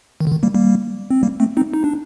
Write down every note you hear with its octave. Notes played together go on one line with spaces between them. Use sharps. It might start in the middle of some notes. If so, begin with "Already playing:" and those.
D#3
D3
D#3
G3 A#3
G3 A#3
C4
G3 A#3
A3 C4
C4 D#4
D#4
D4